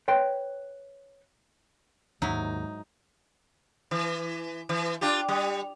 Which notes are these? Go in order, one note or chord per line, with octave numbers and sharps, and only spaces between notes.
B4 C#5 G5 C6
D#2 G#2 F#3 D#4 E4
E3
E3
D4 F4 G4
G3